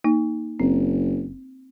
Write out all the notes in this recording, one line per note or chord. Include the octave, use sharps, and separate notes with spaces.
A#3 D#4
F#1 C4